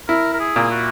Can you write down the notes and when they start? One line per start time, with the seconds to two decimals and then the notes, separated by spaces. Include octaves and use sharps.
0.08 E4 A#4
0.34 A#4
0.40 G#4
0.56 A#2
0.71 F#4